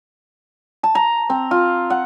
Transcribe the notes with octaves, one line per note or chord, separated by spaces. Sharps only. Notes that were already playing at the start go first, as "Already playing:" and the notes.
A5
A#5
C4
F4
F#5